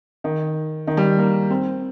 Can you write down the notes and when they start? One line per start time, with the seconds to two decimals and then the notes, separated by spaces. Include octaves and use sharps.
0.24 D#3
0.87 D#3
0.97 G3
1.18 A#3
1.50 C4